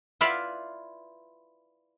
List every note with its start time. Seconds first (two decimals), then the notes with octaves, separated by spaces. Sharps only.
0.21 E4 F4 B4 D5 E5 F5